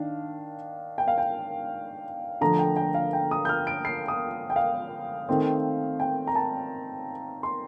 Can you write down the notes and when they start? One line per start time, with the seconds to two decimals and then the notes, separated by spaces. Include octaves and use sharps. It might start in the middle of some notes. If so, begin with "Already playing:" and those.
Already playing: D#3 D4 F5
0.98 G5
1.08 F5
1.18 G5
2.41 D3 F3 A3 A#5
2.59 G5
2.76 G5
2.94 F5
3.13 G5
3.31 D#6
3.45 G6
3.49 F6
3.67 D7
3.85 C7
4.08 D#6
4.50 G5
4.56 F5
5.29 D#3 A3 C4
6.00 G5
6.27 A#5
6.35 A5
7.43 C6